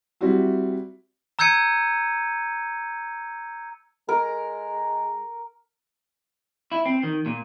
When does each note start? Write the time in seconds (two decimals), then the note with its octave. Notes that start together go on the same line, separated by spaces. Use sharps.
0.21 G3 C4 E4 F#4 E5
1.39 A#5 E6 G6 G#6 C#7 D#7
4.09 G#3 A#4
6.72 E4
6.86 C4
7.03 D#3
7.26 A#2